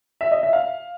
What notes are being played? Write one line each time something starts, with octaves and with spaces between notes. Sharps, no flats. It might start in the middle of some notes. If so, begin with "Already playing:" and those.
E5
D#5
E5
F5